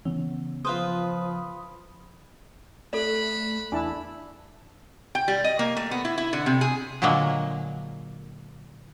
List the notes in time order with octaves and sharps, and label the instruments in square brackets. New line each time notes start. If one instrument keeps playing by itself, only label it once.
[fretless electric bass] C#3 B3 C#4 [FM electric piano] E3
[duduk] F3 [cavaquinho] F4 B4 C5 [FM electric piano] D#6
[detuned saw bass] A3 [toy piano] A4 D5 [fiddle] B5 F#6
[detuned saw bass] E2 [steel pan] D4 E4 A5 [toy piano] G#5
[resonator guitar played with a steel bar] G5
G3
D#5
A#3
A3
B3
E4
E4
D3
C3
G#4
[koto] A#2 D3 F#3 G#3 A#3